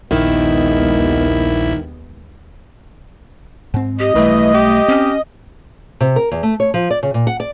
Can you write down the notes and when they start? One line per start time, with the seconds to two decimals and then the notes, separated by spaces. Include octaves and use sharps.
0.11 A#1 D#2 D#3 G#3 B3 E4
3.74 G#2 C4
3.99 G4 D#5
4.15 B1 E3 G3 A3
4.54 G4
4.88 C4 C#4
6.00 C3
6.16 A#4
6.32 E2
6.43 A3
6.60 C#5
6.74 F3
6.90 D5
7.03 C#3
7.14 A#2
7.27 F#5
7.40 D5